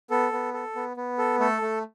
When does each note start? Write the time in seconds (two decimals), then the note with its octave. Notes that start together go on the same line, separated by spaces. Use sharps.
0.10 B3 A4
0.32 B3
0.53 A4
0.75 B3
0.97 B3
1.18 A4
1.40 A3 A4
1.62 A3